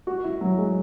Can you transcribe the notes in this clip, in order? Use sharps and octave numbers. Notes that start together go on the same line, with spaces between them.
F#4
E4
F#3
G#3